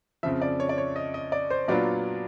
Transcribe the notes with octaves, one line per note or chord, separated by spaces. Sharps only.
F2 C#3 F3 E5
D5
C#5
D5
C#5
D#5
D#5
D5
C5
A#2 F#3 B3 D4 F4 D5